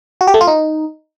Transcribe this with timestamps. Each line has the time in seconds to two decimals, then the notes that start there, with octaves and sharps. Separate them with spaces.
0.21 F#4
0.27 G4
0.34 A3
0.41 F4
0.47 D#4